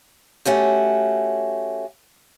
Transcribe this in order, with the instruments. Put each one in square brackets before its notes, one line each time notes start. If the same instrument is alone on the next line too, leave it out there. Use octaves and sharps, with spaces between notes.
[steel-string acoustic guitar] A3 C#4 F#4 G4